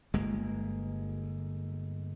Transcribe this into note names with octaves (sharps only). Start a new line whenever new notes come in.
G1 G#3 A#3